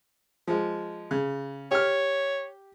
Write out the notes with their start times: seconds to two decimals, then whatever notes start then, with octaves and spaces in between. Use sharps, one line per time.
0.47 F3 G#3
1.11 C#3
1.71 G4 C#5 F6